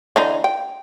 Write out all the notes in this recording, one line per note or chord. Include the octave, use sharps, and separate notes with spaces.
D3 E3 D#4
G5